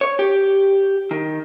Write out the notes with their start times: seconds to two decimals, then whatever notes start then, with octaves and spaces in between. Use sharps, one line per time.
0.01 C#5
0.19 G4
1.11 D#3